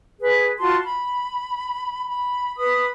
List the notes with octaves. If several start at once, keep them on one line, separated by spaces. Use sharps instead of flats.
G#4 B4
F4 F#4 A5 C6
B5
B5
B4 B5 D#6